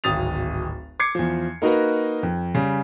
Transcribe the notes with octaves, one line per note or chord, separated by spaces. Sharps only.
D1 G#1 D#6 A6 F7
D6 G#6 C7 C#7
E2 F3
A#3 D#4 F#4 A#4 B4
F2
C#3 G3